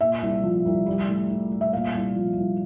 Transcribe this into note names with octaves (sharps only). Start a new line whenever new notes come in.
A#2 E5
C2
F3
C2
G3
A2
A2
G3
E5
A#2 F5
C2
F3
C2